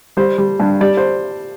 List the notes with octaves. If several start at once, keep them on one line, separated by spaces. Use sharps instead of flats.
G3 C5
G3
G2
G3 D5
C5